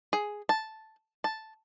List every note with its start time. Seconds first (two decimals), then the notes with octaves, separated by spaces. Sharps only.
0.13 G#4
0.49 A5
1.24 A5